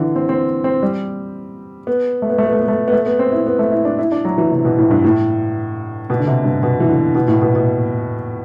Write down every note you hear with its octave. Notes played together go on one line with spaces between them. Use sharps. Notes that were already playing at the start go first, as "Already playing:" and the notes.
Already playing: D3 E3
C4
C4
C4
G3
B3
A3
B3
A3
B3
A3
B3
A3
B3
A3
B3
C4
E4
B3
A3
E4
D4
E4
D4
F#3
E3
C3
B2
A2
G2
A2
B2
D3
C3
G2
B2
E3
D3
B2
A2
B2
B2